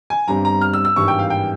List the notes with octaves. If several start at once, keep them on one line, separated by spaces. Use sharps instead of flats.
G#5
G1 G2 G3 C4 A#5
A#5
F6
E6
E6
G#1 G2 E3 G3 C#6
G5
F5
G5